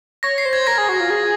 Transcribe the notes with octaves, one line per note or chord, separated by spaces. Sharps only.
C#5 A#6
C7
C5
G#6
A#4 A#6
G#4
F#4
F4
G#4